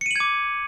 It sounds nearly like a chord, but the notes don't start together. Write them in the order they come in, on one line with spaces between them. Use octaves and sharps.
C#7 D#7 F#7 G#6 D6